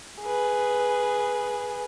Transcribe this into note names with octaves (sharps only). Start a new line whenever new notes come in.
G#4 B4